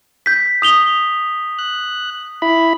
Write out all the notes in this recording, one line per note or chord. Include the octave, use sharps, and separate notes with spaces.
G6 B6
D#6 F7 G7
F#6
E4 B5